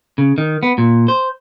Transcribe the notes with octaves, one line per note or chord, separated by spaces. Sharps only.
C#3
D#3
B3
A#2
C5